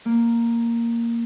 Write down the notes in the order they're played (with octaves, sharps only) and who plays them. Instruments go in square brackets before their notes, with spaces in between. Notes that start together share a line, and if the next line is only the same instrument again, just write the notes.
[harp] A#3